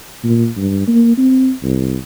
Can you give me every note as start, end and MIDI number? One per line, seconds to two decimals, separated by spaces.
0.24 0.47 46
0.57 0.86 43
0.88 1.16 58
1.17 1.51 60
1.63 1.97 36